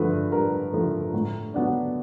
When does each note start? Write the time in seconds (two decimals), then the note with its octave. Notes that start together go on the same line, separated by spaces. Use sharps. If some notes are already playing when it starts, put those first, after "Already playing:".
Already playing: G2 D3 F3 A3 B4
0.32 G2 A#4
0.73 D3 F3 A3
1.14 A2
1.54 F#3 B3 D4